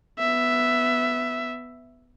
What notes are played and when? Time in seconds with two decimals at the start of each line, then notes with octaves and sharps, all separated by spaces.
0.19 B3 E5